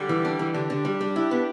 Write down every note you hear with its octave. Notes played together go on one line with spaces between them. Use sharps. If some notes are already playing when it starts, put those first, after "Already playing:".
Already playing: D3 G3
E3
D4
E3
D3 D4 G4
D3
G3
G3
E4
B3